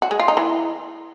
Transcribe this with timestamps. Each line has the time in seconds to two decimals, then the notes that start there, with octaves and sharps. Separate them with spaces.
0.02 F#4
0.11 G#3
0.19 F4
0.28 D#4
0.37 E3